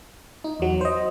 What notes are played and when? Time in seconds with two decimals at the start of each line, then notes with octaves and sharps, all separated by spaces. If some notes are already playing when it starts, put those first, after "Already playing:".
0.44 D#4
0.60 E2 F#3
0.81 C5 D#5